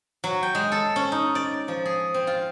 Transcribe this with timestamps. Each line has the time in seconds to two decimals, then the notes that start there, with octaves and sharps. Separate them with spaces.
0.24 F#3
0.43 G5
0.55 G#3
0.72 A4
0.96 C#4
1.12 D#4
1.35 D5
1.68 F3
1.86 G#4
2.14 C4
2.27 F4